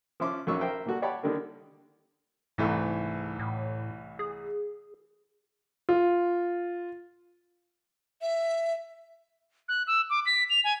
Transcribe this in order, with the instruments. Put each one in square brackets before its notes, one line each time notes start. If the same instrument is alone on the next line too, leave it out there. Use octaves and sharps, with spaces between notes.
[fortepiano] F3 C#4 E5 C6 D6
A#1 D#3 F#3 C#4 C#6 E6
A#4 C5 E5 G5
A#2 G3 F#4 A4
G4 C#5 D5 F#5 A5 B5
D3 D#3 G3 A#3
[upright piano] C2 E3 A3 [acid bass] G#2
[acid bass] A2
G#4
[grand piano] F4
[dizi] E5
[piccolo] F#6
E6
D6
B6
F7
G#5